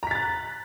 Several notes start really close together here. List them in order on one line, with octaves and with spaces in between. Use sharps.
A#5 B6 A6 F#6